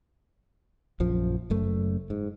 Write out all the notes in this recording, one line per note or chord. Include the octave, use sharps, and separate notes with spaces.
A#1 F#2 F3
F#1 F#2 A3
G#2